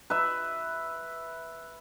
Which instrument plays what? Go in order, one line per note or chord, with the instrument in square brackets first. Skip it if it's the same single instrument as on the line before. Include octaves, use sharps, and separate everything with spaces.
[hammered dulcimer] B4 E5